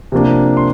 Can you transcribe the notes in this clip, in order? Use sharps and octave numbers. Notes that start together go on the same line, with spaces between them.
C3 F3 A#3 D4
C6